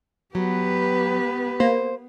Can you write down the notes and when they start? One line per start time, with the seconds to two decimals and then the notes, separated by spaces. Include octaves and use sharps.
0.35 F#3 B3 G4 B4
1.60 A#3 C5